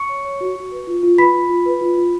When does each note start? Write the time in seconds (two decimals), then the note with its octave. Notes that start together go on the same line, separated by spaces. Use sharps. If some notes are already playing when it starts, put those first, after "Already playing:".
Already playing: C#6 C#7
0.09 C#5
0.25 C#5
0.41 F#4
0.55 F#4
0.72 B4
0.87 F4
1.03 F4
1.18 B4 B5 B6
1.34 F4
1.49 F4
1.66 B4
1.81 F4
1.97 F4